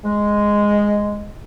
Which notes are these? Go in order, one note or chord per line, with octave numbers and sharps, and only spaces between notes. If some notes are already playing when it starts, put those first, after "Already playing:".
G#3